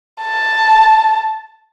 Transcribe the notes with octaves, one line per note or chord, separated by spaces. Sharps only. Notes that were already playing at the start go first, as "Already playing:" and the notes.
A5